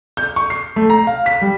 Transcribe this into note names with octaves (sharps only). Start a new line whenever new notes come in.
G6
C#6
C7
A3
A#5
F5
B6
G3